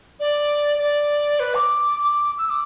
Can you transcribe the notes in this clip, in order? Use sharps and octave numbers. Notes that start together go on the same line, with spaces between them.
D5
D5
B4
D6
D6
E6
D6